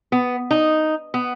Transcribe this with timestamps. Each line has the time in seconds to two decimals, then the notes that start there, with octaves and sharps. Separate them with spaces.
0.12 B3
0.51 D#4
1.14 B3